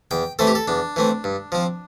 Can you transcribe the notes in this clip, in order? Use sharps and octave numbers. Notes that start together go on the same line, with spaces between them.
E2 G5
E3 A3 C4 A4
G4
A4
E2 D4
E3 A3 C4
G2
F3 C4